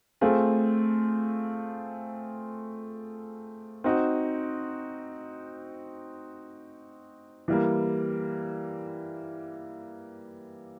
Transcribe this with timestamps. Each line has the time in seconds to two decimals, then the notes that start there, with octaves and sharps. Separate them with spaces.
0.21 A3 C4 F4 G#4
3.84 C4 D#4 F#4
7.48 E3 G3 A#3